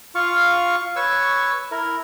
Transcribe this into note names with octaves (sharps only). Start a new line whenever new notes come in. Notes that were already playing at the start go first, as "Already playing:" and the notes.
F4 F5 C#6
B4 C#5 C#6 E6
E4 A#4